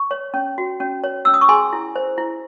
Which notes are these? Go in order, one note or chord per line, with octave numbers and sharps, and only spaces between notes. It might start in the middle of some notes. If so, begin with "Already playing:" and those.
Already playing: C#6
C#5
C#4
F#4
C#4
C#5
C#4 E6
D#6
C#6
G#4 G#5 C6
E4
C5
E4